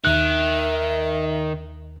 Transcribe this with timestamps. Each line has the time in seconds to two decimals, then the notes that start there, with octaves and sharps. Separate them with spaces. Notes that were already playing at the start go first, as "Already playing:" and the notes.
0.05 D#2 D#3 E5 F#6